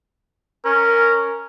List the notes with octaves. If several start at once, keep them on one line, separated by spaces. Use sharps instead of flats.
C#4 A#4